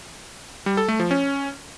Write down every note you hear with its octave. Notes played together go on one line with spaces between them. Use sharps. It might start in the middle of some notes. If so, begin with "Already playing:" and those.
G3
A4
A3
F3
C#4